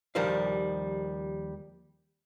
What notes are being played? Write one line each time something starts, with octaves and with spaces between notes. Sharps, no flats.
D#2 F3 G3 A#4 C5 F5